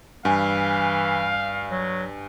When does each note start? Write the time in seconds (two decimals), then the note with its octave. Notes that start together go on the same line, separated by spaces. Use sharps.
0.25 G2 E3 F5 G#5
1.71 F#3